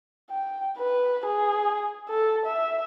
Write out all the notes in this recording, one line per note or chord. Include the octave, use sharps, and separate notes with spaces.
G5
B4
G#4
A4
E5